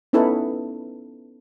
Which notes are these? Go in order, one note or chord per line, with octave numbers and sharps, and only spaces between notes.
B3 C#4 D#4 E4 A4 B4